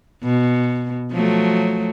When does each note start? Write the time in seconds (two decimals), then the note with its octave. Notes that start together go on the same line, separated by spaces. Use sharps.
0.24 B2
1.12 F3 F#3 A3